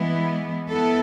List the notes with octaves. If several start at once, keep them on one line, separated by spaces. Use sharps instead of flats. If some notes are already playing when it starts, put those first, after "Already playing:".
Already playing: E3 G#3 B3 E4
B3 E4 A4